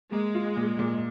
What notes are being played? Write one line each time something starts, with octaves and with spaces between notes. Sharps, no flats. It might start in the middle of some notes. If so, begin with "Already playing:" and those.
G#3 A#3
F4
A#2
A#2